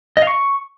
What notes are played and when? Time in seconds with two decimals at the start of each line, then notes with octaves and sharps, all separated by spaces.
0.17 D#5
0.22 F5
0.27 C#6